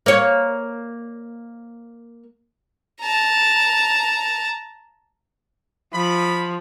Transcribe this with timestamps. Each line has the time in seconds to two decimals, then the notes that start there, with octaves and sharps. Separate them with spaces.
0.06 A#3 C#5
3.01 A5 A#5
5.94 F3 B5